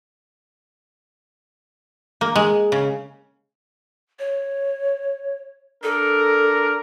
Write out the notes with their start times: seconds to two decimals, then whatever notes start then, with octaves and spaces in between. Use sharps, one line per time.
2.21 A#3
2.35 G#3
2.72 C#3
4.19 C#5
5.83 D4 A4 A#4